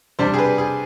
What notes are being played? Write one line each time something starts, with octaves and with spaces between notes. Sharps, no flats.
C3 G3 D4 C5
G#4
B4
G#4